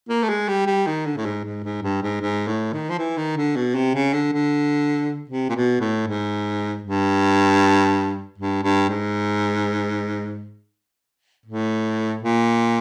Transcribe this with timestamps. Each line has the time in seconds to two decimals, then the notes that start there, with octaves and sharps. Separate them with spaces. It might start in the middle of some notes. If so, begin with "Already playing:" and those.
0.09 A#3
0.23 A3
0.29 G#3
0.48 G3
0.66 G3
0.86 D#3
1.05 D3
1.17 A2
1.25 G#2
1.44 G#2
1.64 G#2
1.82 G2
2.02 G#2
2.21 G#2
2.47 A2
2.73 D#3
2.89 F3
2.98 E3
3.17 D#3
3.37 D3
3.56 B2
3.75 C3
3.95 C#3
4.13 D3
4.33 D3
5.29 C3
5.49 A#2
5.56 B2
5.80 A2
6.07 G#2
6.84 G2
8.38 G2
8.63 G2
8.89 G#2
11.46 A2
12.23 A#2